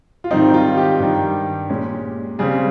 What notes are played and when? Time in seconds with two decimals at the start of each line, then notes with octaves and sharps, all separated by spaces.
0.24 F4
0.31 G#2 D#3 G3 C4 D#4
0.54 F4
0.77 G4
1.00 G2 D#3 G3
1.69 A#2 G#3 C#4
2.39 C#3 G3 C4 G#4